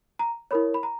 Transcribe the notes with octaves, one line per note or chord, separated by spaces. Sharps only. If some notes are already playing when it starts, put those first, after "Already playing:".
A#5
E4 A#4 C#5 B5
B5
A#5